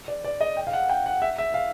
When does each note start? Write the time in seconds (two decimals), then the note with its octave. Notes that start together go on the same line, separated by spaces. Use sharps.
0.08 D5
0.24 D5
0.41 D#5
0.57 G5
0.67 F5
0.73 F#5
0.90 G5
1.06 F#5
1.22 E5
1.38 E5
1.54 F5